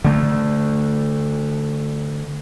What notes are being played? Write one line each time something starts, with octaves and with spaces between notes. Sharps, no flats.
D3 A3